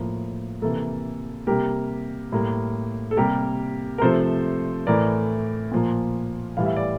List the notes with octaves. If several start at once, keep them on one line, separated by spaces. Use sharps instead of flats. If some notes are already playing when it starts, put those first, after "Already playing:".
Already playing: A2 F3 A#3
C3 E3 A#3 A4
C3 G3 A#3 G4 A#4
A2 G3 A#3
A4
C3 G3 A#3 G4 A#4
A#4
C3 F3 A3 A4 C5
A2 E3 A3 A#4 D5
A#2 F3 A#3
A2 E3 G3 F5
E5
D5